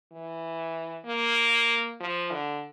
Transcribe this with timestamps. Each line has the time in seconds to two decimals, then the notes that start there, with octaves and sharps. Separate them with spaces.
0.12 E3
1.05 A#3
2.00 F3
2.31 D3